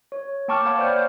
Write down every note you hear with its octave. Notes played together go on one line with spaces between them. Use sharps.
C#5
A#3 G5 A5 C#6 D6 F6
C#5 F5 F#5 B5 F6
C5 D5 G5 B5 F6 G6